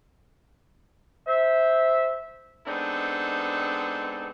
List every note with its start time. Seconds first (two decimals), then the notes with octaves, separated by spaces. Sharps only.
1.28 C5 E5
2.67 G#3 B3 C4 D4 D#4 A4